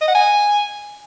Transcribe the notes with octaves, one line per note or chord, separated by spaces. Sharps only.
D#5
F#5
G#5